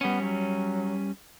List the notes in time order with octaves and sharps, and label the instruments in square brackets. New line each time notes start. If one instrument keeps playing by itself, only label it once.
[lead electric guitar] G3 C#4 [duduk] B3
[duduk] F#3